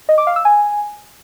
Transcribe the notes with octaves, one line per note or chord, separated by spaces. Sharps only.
D#5
D6
F5
E6
G#5